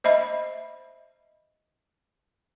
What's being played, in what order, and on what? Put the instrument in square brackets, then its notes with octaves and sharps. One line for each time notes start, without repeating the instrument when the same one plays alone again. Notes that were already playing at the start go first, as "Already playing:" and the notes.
[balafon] C5 D#5 E5 B5